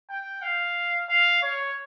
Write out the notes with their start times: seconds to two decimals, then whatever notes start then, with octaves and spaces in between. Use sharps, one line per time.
0.10 G5
0.42 F5
1.09 F5
1.42 C#5